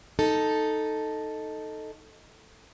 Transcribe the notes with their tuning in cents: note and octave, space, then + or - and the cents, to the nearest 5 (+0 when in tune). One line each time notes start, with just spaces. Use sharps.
D#4 +0 A4 +0